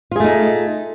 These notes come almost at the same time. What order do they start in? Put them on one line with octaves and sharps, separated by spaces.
F4 G#4 A3 D#4